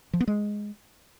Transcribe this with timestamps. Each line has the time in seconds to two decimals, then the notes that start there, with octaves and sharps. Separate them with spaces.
0.13 F3
0.20 B3
0.27 G#3